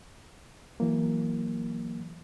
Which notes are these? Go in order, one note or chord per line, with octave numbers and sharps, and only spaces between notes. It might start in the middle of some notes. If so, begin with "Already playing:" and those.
E3 F#3 A#3